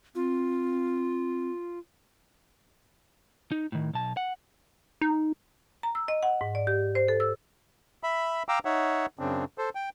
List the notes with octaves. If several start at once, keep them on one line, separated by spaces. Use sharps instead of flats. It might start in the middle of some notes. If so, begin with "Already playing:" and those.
C4 F4
D#4
A2 D#3
B1 A5
F#5
D#4
A#5
E6
D#5
F#5
G#2
D5
G4
C5
A4
E6
E5 B5
F5 G5 A#5 D6 E6
D#4 C#5 E5 F#5
F#2 C#3 C4 D4
A4 C5
G5